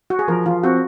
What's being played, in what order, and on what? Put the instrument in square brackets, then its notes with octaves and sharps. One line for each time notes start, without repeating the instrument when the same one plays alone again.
[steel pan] F#4
G#4
[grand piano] F3 [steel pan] A#4
[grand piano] F3 [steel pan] F4
[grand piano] C4 [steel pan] F#4